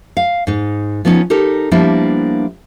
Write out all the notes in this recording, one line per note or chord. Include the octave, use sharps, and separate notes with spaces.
F5
G#2 D#4
F3 B3 C#4 D#4
D#4 G4 A4 A#4
F3 G3 A#3 B3 D4 E4